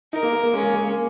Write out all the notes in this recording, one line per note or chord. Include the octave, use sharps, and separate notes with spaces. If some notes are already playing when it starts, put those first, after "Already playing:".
D#4 A#4
A#3
A#3
A#3
G#3 C#4
A#3
G#3
A#3